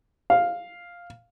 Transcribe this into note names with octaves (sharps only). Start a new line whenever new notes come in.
F5